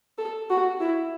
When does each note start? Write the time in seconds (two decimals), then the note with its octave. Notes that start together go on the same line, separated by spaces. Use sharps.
0.18 A4
0.50 F#4
0.80 E4